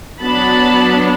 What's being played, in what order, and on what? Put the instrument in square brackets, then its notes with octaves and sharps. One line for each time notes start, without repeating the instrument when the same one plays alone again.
[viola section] F#3 B3 D4 A5 B5